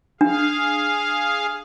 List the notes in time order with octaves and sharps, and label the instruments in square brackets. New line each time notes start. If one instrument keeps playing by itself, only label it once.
[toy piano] D4 [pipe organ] G#4 F5